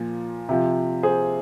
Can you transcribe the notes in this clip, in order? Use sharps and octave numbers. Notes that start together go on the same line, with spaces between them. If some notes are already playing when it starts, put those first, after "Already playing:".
Already playing: A#2 F3
C3 F3
G#4 C5